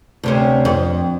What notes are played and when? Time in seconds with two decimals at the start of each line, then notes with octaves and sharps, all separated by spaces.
0.23 D2 C3 C#4
0.65 F2